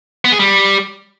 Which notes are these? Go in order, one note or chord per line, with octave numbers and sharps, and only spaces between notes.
B3
G#4
G3